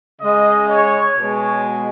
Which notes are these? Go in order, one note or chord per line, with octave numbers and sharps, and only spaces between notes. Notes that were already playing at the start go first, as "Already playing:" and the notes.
C#3 G#3 D#5
C#5
B2 G#3 C#5